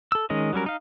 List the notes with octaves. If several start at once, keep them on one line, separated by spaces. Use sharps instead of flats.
A4 E6
D#3 G#3 C#4 D#5
F#3 G3 C#4 A#4
D#4 F5